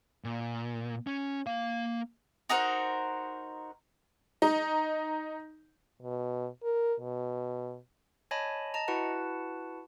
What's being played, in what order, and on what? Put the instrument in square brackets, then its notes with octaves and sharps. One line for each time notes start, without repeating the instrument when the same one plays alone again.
[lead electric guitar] A#2
C#4
A#3 F5
[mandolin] D#4 F#4 A#4 C5
[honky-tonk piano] D#4
[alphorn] B2
A#4
B2
[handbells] C#5 D#5 G#5 A5 B5
D#5 A5 A#5
E4 F#4 B4 F#5 A5